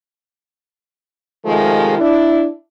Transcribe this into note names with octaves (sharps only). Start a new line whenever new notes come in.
C3 D#3 F3 G#3 A3
D4 E4